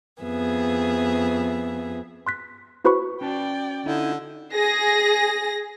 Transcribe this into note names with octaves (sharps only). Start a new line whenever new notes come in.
F2 B3 G#4 E5
C6 F#6 B6
E4 F#4 B4 C5 B5 C#6
C#4 F#4 D5 G5 A5
D3 D#4 E4
G#4 A#6